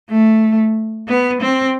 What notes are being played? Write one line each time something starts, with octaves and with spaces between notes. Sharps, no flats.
A3
B3
C4